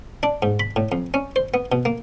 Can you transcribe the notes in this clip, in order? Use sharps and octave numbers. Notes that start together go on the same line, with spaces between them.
D4
G#2
B5
A2
F2
C#4
C5
B3
B2
A#3